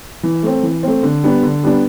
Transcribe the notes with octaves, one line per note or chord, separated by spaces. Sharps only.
E3
A3 C4
E3
A3 C4
D3
G3 B3 D4
D3
G3 B3 D4